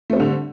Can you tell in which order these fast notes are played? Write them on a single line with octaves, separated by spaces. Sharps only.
A3 C4 G3 D3